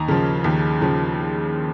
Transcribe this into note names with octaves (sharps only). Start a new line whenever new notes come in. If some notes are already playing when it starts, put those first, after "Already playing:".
Already playing: D#2 A#5
C#3 F3
D#2
C#3 F3